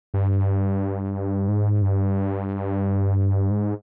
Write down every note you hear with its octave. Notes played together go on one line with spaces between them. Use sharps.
G2
G#2
G2
G#2